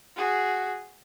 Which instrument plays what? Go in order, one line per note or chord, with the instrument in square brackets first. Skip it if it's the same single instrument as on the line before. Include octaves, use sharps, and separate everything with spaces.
[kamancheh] F#4 G#4